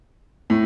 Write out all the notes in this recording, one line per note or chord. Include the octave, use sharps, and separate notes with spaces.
A2